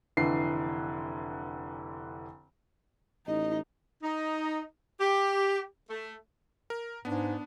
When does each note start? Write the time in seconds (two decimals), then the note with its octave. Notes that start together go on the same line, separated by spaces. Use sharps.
0.17 F1 D3 E3 C7
3.27 A1 D#4 D#5
4.02 D#4
5.00 G4
5.90 A3
6.70 A#4
7.05 G#2 B3 D4